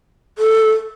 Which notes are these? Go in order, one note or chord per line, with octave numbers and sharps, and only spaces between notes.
A4